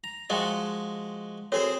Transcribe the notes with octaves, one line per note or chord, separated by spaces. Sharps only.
A#5
F3 G#3 F#4 D#5 G5
C4 F#4 G#4 A4 C5 C#5